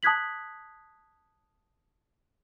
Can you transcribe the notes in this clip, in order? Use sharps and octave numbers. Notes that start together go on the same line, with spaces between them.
A5 D#6 F#6 G#6 B6 F#7